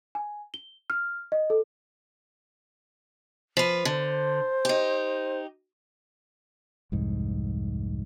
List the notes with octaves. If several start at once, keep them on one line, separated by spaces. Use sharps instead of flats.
G#5
G7
F6
D#5
A4
F3 B4
D3 C5
D#4 G4
C2 F2 G#2